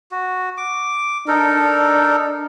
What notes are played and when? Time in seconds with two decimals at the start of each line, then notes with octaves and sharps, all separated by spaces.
0.11 F#4
0.57 D6
1.28 D4 D#4 A4 A#4